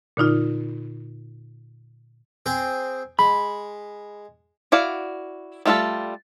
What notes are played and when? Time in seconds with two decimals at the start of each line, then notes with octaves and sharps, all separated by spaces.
0.17 A#2 D3 D#4 F4
2.46 C4 G#4 G5
3.19 G#3 B5
4.72 E4 F#4 D5 F5
5.65 G3 A3 F4 F#4 A4